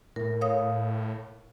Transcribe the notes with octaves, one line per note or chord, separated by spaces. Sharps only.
A2 A#4
C#5 F5 D#6